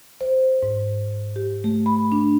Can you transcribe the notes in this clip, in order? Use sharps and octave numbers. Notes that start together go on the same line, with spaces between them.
C5
G#2
G4
A3
B5
D4